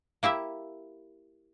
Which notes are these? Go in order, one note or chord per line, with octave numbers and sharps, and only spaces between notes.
A#3 E4 G4 E5